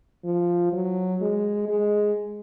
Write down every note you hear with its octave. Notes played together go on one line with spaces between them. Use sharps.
F3
F#3
G#3
G#3